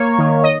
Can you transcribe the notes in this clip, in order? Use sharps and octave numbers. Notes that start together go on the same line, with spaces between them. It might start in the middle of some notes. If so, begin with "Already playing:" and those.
Already playing: A#3 C#5
D#3
D#5